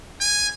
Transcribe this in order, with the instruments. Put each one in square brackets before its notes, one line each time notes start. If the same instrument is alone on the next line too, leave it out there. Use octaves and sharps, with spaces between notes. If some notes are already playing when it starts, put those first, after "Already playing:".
[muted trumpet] G#5